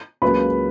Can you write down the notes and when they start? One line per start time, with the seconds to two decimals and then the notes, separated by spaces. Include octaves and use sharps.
0.22 C#2 C#3 F#3 A#3 B4 B5